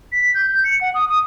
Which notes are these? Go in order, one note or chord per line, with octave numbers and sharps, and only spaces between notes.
B6
G6
G6
C#7
F#5
D#6
D#6